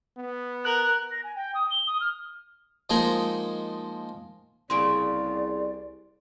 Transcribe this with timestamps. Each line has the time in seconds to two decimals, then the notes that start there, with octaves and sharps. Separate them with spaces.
0.17 B3
0.65 A#4 F#6
1.11 A#6
1.24 G#5
1.36 G5
1.55 D#6
1.71 G7
1.87 D#6
2.01 F6
2.90 F3 G#3 A#3 D#4 G#4 A#4
4.70 C2 C#3 A#3 D5 C6 D7